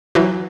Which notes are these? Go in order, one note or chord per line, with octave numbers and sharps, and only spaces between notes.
E3 F#3